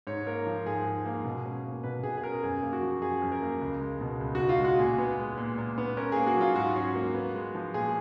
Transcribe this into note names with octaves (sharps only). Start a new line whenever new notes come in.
G#2 C#5
A#3 A#4
F3
G#2 G#4
G#2
A#3
B2
C#4
A#3
B2 B4
B2 G#4
G#4
C#4 A#4
F#2 G#4
A#3
F#4
F3
F#2 G#4
F#2
A#4
A#3
C#2
G#3
B2
C#2
C#2 F#4
F4
G#3
F#4
A#2 G#4
B3
G#3
A#2
A#2
B3
C#4 A#4
A#3 G#4
F#4
F#3 F4
G#2 F#4
C#4
A#3
B3
G#3
F3
A#2 G#4